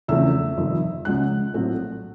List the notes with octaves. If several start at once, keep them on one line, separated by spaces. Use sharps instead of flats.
E2 C#3 F3 A3 C4 E5 E6
G1 F2 C3 D#3
C#2 C#3 F3 G#3 C#4 F#5 F#6
A#1 A2 F#3 A3 C4